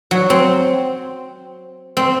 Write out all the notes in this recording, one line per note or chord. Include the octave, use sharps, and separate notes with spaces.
F#3
C4
C4